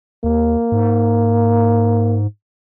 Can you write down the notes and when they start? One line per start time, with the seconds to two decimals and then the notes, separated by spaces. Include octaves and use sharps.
0.24 D#2 A#3
0.72 G#2